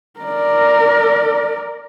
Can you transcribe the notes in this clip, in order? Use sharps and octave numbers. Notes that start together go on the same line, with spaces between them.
A#4 D5